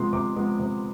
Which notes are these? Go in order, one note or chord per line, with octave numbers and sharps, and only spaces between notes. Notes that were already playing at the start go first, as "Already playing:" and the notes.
Already playing: C3 F3 G#3 B3 C6
C3 D6
F3 G#3 B3
C3